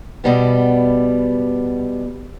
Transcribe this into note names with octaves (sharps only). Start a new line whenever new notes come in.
B2 G3 B3